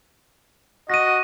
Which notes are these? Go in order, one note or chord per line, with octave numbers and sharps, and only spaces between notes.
F#4 D#5 A#6 D#7